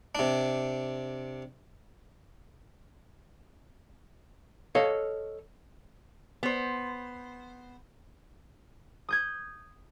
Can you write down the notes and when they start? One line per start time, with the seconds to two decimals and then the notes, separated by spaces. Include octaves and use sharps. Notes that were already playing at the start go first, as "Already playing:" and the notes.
0.15 C3 D4
4.75 A4 C#5 D#5 F5
6.43 B3 C5
9.09 D#6 G6 G#6